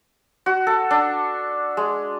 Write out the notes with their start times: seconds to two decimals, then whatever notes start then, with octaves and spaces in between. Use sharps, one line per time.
0.46 F#4
0.67 A4
0.91 D4
1.77 G#3